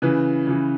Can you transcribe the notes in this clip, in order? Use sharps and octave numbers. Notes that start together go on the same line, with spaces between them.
C#3 E3 B4
C#3 E3